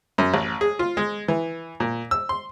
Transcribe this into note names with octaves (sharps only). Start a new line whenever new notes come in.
F#2
A1
G#4
F4
G#3
E3
A#2
E6
C6